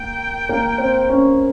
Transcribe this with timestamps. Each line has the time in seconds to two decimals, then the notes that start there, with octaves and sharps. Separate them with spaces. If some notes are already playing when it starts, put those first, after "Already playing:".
Already playing: A#3 G5
0.49 A#3
0.78 C4
1.09 C#4